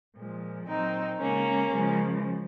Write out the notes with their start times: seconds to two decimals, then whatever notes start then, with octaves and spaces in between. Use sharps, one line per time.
0.16 A#2 F3 G#3
0.67 A#2 F#3 C4 D#4
1.19 C#3 G#3 A#3 C#4
1.71 C#3 F3 G#3